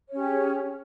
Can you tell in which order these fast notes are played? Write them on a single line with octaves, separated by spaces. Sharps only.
C#5 C#4 G4 G#4